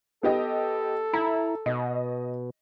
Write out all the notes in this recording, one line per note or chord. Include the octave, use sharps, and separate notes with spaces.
B3 G4 A4 D#5
E4 A#5
B2 D#5